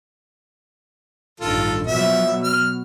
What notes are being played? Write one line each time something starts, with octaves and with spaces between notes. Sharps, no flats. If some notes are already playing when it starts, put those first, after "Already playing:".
A1 G2 D#3 F4 A4
B2 F3 F#3 B3 E5
F6